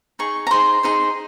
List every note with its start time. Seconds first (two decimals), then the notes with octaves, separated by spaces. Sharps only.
0.19 D#4 G#4 C#6
0.47 A#5
0.51 D#4 G#4 C5 C6
0.83 D#4 G#4 C5